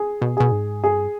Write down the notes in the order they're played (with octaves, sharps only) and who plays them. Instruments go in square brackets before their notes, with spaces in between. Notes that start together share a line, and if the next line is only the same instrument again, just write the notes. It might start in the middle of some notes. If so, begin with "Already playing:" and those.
Already playing: [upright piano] G#4
[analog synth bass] B2
[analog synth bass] B2 [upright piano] G#4
[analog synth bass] G#2
[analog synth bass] G2 [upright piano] G#4